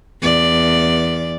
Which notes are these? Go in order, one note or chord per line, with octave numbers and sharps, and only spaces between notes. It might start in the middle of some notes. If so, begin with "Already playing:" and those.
E2 D5